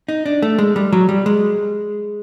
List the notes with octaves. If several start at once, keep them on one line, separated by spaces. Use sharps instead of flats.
D#4
D4
A3
G#3
G3
F#3
G3
G#3